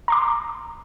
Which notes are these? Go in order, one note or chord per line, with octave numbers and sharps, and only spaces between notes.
A#5 C6 D6